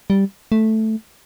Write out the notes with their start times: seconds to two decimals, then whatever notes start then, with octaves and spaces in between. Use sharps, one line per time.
0.10 G3
0.52 A3